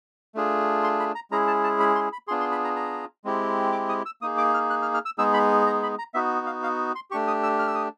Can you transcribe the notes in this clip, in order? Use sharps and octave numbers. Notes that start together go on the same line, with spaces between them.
A3 D4 F4 G#4
C6
B5
A#5
G#3 C#4 E4 G#4 A#5
A5
A5
B5
C6
B5
B3 D4 F4 G#4 C6
C6
B5
A#5
A#5
G#3 C4 E4 G4
D6
D#6
E6
A#3 D#4 G#4 D#6
D6
F6
F#6
F6
F6
E6
G#3 B3 D#4 G#4 E6
B5
A#5
B5
A#5
B3 D#4 F#4 E5
F5
F5
C6
A3 D4 G4 C#6
D#6
E6
F6
E6
D#6